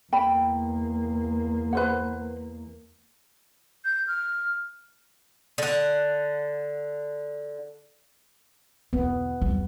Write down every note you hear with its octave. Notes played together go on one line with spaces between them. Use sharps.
E2 A#3 G5 B5
B4 C5 F#5
G6
F6
D3 F#5
E2 D3 B3
E2 G3